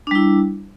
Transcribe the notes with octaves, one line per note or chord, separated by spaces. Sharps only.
G3 D4 E4